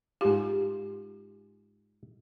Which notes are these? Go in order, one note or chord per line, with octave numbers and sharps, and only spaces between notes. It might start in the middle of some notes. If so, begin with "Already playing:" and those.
G#2 F4 G4